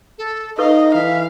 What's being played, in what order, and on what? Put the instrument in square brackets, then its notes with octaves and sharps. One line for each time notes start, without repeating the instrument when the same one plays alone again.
[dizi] A4
[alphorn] D#4 [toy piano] A4 B4 C#6 [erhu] D#5 [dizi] F5
[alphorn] E3 [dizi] E5 [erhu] F5